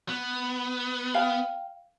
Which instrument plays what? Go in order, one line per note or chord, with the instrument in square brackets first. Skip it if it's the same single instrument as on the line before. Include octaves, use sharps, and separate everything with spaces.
[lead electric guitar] B3
[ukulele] F5 G5